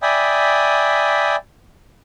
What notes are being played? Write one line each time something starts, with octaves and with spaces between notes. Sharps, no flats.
D5 E5 G5 G#5 B5 D#6